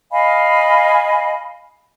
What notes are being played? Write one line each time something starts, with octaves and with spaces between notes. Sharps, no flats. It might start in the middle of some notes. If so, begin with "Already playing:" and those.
D#5 F5 G#5 B5